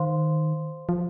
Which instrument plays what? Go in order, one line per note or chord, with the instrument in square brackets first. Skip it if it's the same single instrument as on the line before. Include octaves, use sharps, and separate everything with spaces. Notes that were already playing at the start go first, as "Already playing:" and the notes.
Already playing: [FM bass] D#3 [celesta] C5 F5 C6
[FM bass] F3